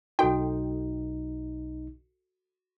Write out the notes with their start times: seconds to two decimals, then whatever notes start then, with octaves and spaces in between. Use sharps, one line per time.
0.19 B1 D#4 F#4 A4 G5